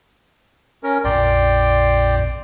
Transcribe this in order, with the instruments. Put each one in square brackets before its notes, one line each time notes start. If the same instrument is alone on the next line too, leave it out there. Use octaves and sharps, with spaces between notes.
[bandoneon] C#4 A#4
[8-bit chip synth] A#1 F2 A#2 [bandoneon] D5 G5 C6